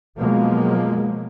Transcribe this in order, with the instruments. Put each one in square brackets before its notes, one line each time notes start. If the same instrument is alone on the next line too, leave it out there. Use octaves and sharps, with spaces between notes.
[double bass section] B2 F3 F#3 G#3 A#3